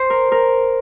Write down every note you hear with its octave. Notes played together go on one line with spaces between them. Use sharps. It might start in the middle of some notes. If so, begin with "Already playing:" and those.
Already playing: C5
A#4
A#4